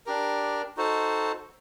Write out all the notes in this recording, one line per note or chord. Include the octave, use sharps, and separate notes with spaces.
D4 G4 A#4
D#4 F#4 A4 C5